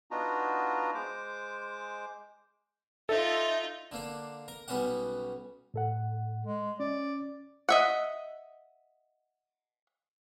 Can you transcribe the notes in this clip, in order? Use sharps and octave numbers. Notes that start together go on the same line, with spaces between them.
B3 D4 D#4 F4 F#4 A#5
G#3 C5 D6
D#4 F4 A4 E5
D3 A#3 D4
A#4
B1 G3 B3 C#4 F#4 F#5
A2 A4 F#5
G#3
C#4 D5
D#5 E5 F#5